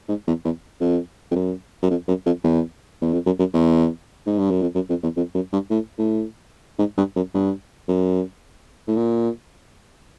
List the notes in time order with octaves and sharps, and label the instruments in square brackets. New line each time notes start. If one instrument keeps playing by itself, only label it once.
[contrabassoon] G#2
E2
E2
F2
F2
F#2
F#2
F2
F#2
F2
E2
E2
F2
F#2
F#2
E2
G#2
G2
F#2
F2
F#2
F2
E2
F2
F#2
G2
A2
A2
G#2
G2
F#2
G2
F#2
A2
A#2